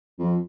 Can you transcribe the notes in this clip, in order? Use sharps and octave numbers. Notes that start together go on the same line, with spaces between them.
F2